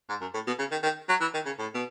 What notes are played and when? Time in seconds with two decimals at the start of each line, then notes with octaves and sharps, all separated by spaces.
0.09 G#2
0.21 F#2
0.34 A2
0.47 B2
0.59 C#3
0.71 D#3
0.83 D#3
1.09 F#3
1.20 E3
1.34 D#3
1.45 C#3
1.59 A2
1.74 B2